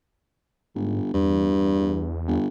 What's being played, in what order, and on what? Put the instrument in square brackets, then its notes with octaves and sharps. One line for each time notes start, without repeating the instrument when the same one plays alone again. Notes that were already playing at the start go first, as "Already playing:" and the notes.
[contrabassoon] G1 [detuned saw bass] G#2
[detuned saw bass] E2 [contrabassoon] G2
[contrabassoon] G1